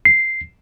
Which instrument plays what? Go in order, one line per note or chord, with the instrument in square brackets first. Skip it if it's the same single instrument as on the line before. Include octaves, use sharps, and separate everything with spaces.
[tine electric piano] C7